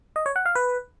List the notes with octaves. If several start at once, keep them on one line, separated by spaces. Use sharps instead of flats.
D#5
C#5
F#5
F5
B4